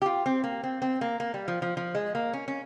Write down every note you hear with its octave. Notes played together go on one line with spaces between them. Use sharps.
G4
F4
C4
A#3
C4
C4
A#3
A#3
G3
F3
F3
F3
G#3
A#3
C#4
C#4